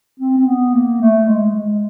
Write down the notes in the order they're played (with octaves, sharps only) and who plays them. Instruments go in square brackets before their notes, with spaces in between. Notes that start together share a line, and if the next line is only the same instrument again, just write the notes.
[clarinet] C4
C4
B3
A#3
A3
G#3
G#3